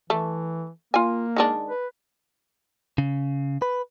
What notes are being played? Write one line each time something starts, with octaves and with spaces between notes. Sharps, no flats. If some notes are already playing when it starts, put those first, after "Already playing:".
E3 A3
A#3 F4 G#5
D#3 G#3 D4
B4
C#3
B4